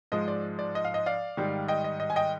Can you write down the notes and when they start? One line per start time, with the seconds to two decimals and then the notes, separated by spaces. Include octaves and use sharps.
0.12 G#2 F3 G#3 D#5
0.28 D5
0.59 D5
0.75 D#5
0.85 F5
0.94 D#5
1.06 D5 F5
1.37 G#2 D#3 G3
1.68 D#5 G5
1.84 D#5
2.00 D#5
2.10 G#5
2.16 D#5 G5